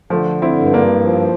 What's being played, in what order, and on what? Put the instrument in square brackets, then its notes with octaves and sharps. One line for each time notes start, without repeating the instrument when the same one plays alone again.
[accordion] D3 [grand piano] F3 A3
[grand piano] C4 E4
[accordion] G2
[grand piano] A#3 D4
[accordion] F3